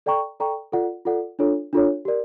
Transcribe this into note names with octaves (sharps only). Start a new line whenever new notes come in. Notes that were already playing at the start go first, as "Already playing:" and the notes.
A4 D5 G5 A#5 C#6
A4 D5 G5 A#5 C#6
F4 A4 D5 F#5
F4 A4 D5 F#5
D4 F4 A4 C#5
D4 F4 A4 C#5
G4 A#4 D5